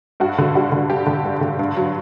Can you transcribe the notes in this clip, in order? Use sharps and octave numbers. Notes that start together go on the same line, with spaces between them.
G2 F#4
D3
G3 F#4
D3
G2 G4
D3
G2
D3
G2
F#3